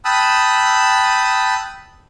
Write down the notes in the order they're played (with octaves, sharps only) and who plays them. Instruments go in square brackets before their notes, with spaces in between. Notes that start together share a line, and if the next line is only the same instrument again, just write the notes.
[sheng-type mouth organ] G5 A5 B5 D#6 E6 F#6